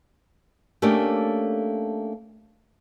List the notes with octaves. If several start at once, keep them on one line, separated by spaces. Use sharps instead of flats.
A3 A#3 C#4 D4 G4 A4